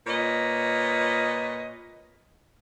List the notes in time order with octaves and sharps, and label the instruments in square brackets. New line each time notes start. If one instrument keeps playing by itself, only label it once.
[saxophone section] A#2 B4 C#5 D#5